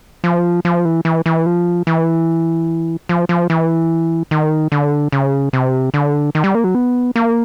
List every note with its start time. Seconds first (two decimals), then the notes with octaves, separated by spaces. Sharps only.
0.24 F3
0.65 F3
0.85 E3
1.05 E3
1.26 E3
1.46 F3
1.87 E3
3.09 F3
3.29 F3
3.50 E3
4.31 D#3
4.72 D3
5.12 C#3
5.53 C3
5.94 D3
6.35 D#3
6.44 G3
6.55 A#3
6.64 F#3
6.75 B3
7.16 A#3